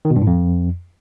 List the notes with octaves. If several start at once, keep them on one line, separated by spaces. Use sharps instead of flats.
D#3
B2
G2
A2
F2